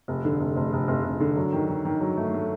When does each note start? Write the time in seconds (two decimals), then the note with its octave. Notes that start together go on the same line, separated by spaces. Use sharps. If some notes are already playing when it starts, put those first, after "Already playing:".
0.08 F1
0.25 D3
0.40 F1
0.56 F1
0.73 F1
0.88 F1
1.05 F1
1.20 D3
1.36 F#3
1.53 D#3
1.69 D#3
1.85 D#3
2.01 F#3
2.17 A3
2.34 A3